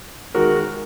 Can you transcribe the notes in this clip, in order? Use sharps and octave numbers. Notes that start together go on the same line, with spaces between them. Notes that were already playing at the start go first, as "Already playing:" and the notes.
D#3 G#3 F#4 A#4